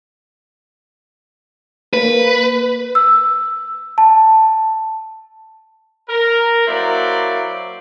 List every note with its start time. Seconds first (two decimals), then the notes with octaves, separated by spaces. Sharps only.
1.94 A#3 B4
2.95 E6
3.98 A5
6.08 A#4
6.67 F#3 A#3 E4 C5 D5